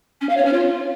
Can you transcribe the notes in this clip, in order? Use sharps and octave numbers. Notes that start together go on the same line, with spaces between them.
C#4
F5
C#5
C#4
F4